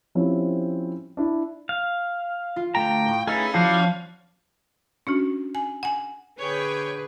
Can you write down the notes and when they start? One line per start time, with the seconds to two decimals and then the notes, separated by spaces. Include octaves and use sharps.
0.15 F3 G3 C4 C#4 E4
1.17 D4 E4
1.69 F5
2.56 F4
2.75 D3 A3 G5 A#5
3.06 A2
3.27 A3 C#4 D#4 E4 G#4 B4
3.54 F3 E4 F#4 C5 D5 F5 A5
5.07 C#4 D4 F#4
5.55 G#5
5.83 F#5 G#5
6.40 D3 G#4 B4 C#5 G5